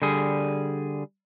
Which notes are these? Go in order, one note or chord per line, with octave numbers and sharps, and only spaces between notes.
D3 G3 G#4